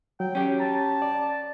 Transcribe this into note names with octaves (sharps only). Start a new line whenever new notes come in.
F#3 G5
C#4 G4
A5 A#5
D5